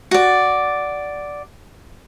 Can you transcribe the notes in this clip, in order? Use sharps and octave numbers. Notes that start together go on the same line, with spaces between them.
F#4 D5